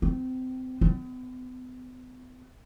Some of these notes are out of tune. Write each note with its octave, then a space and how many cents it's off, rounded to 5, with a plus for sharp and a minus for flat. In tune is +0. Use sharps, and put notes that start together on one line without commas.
C4 -30
B3 +40